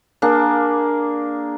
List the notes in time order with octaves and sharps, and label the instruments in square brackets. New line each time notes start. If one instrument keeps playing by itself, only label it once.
[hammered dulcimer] A#3 D4 G#4